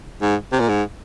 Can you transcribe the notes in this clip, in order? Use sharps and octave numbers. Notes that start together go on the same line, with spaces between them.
G#2
C3
A#2
G#2